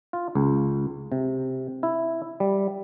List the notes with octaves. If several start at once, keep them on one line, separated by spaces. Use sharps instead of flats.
F4
C#2
C3
E4
G3